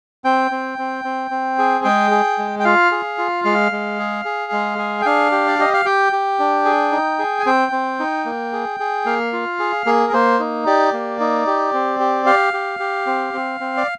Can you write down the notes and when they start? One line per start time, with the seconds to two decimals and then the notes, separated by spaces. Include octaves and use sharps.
0.24 C4 G5
0.51 C4
0.78 C4
1.05 C4
1.31 C4
1.58 G#4
1.85 G#3 G5
2.11 G#4
2.38 G#3
2.60 G5
2.65 F4 F5
2.91 G#4
3.18 F4
3.45 G#3 F5
3.72 G#3
3.99 G#4
4.25 G#4
4.52 G#3
4.79 G#4
5.01 G5
5.06 D4 F5
5.32 G4
5.48 D5
5.59 G4 D#5
5.73 F5
5.85 G4 G5
6.13 G4
6.39 D4
6.65 G#4
6.92 D#4
7.19 G#4
7.40 G#5
7.46 C4 G5
7.72 C4
8.00 D#4
8.26 A#3
8.53 G#4
8.80 G#4
9.06 A#3 F5
9.33 F4
9.59 G#4
9.86 A#3 G#4
10.07 A#4
10.13 A#3 C5
10.40 D#4
10.66 G4 D5
10.93 A#3
11.20 D#4
11.47 G4
11.74 C4
12.00 G4
12.26 G4 F5
12.53 G4
12.80 G4
13.07 C4
13.34 C4
13.60 C4
13.77 D5